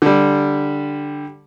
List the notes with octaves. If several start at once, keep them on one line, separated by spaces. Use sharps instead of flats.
D3 G3